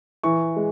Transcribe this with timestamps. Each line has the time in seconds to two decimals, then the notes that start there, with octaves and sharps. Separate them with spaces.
0.23 E3 C#6
0.56 G#3